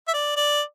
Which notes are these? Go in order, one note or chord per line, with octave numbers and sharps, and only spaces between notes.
E5
D5
D5